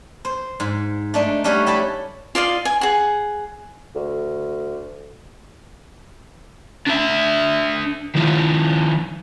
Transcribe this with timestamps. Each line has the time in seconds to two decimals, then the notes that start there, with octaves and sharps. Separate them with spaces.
0.25 C5
0.60 G#2
1.14 A3 D4 D#4
1.44 G3 A3 C#4 G4 C#5 F#5
1.66 E4 G4 A5 B5
2.35 F4 D5 D#5 F5
2.65 G#5
2.81 G#4 F#5
3.95 D2
6.87 D4 E5
8.15 D#3 F3